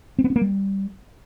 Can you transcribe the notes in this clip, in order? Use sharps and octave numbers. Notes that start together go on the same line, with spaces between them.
C4
B3
C#4
A#3
G3